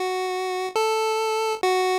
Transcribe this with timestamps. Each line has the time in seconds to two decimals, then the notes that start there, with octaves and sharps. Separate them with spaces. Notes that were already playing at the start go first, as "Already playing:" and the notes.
Already playing: F#4
0.76 A4
1.63 F#4